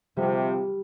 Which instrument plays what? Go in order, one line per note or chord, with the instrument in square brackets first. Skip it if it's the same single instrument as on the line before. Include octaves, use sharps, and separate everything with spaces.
[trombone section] C3 F3 [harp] G3